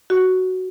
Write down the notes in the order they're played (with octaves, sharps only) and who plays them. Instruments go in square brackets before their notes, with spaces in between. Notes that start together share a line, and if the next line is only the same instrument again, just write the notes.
[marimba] F#4